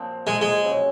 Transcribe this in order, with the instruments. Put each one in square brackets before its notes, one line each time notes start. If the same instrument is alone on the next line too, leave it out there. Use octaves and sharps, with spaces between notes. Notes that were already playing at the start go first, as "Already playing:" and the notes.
Already playing: [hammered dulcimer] A#2 F3 C4
[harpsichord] G#3
G#3
[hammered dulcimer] C#3 F#3 C4